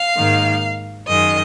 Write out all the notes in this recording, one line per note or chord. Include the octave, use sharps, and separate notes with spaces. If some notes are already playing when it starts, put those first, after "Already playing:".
Already playing: F5
G#2 D#3 A#3
F#2 D#3 G#3 D#5